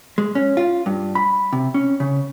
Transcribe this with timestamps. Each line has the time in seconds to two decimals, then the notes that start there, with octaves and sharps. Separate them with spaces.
0.18 G#3
0.35 C#4
0.57 F4
0.86 G2
1.15 B5
1.53 C3
1.74 C#4
2.00 C#3